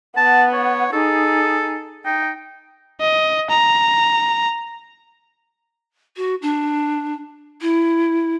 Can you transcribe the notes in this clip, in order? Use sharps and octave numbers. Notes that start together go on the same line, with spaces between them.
B3 F#5 A5
C#5
D#4 G#4 A4
D#4 G5
D#5
A#5
F#4
D4
E4